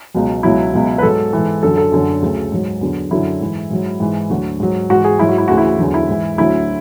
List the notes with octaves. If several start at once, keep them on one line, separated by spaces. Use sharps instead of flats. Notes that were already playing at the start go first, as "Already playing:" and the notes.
C#2 B2 F#3
C#2 B2 F#3 E4
C#2 B2 F#3
B4
G#2 F#3 A4
G#2 E3
F#2 D3 F#3 A4
A4
F#2 D3 F#3
D2 C#3 F#3
G#2 F#3
E2 D3 F#3
F#2 D3 F#3 E4
G#2 E3
G#2 F#3
G#2 E3
D2 D3 F#3 F#4
G#2 F#3
G#2 E3 F#4
G#4
G#2 F#3 E4
F#4
E4
D2 C#3 E3 F#4
E4
E2 D3 F#3
E4
G#2 E3
D2 D3 F#3 E4